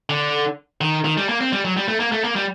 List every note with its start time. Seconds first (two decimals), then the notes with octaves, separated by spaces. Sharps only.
0.10 D3
0.81 D#3
1.05 D#3
1.17 G3
1.29 A#3
1.41 C4
1.53 G3
1.65 F#3
1.77 G3
1.88 A3
2.00 A#3
2.12 A3
2.24 A#3
2.36 G3